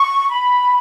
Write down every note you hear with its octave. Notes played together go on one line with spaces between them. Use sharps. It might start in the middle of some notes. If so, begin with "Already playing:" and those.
Already playing: C#6
B5